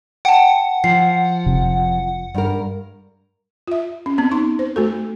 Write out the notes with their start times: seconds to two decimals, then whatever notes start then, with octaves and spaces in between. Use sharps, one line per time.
0.25 F#5 G5 A5
0.84 F3 C7
1.46 F1 C3
2.34 G2 A#4
3.67 F4 E5
4.06 C#4
4.18 B3 C4
4.31 D#4 C6
4.59 C5
4.76 A3 F#4 A4